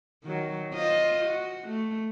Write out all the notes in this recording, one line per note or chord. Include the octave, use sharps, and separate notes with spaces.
D#3 F#3
F4 C5 D#5
F#4
A3